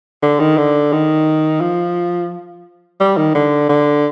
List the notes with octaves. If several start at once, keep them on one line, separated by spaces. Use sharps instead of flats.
D3
D#3
D3
D#3
F3
G3
D#3
D3
D3